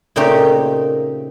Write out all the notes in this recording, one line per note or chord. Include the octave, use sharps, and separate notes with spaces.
A#2 C#3 A3 C4 D#4 G4